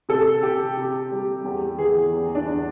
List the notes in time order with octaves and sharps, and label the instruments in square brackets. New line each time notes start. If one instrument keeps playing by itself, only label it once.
[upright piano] C3 A4
C3 G4
C3
G3
E2 G4
E3 G#4
E2
D4
E2